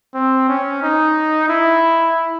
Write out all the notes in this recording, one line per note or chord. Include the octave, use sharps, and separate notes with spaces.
C4
C#4
D#4
E4